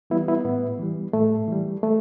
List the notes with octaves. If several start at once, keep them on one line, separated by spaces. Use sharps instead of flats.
E3 G3 B3 E4
B3 E4
A2 B3
E3 G3
A2 A3
E3 G3
A3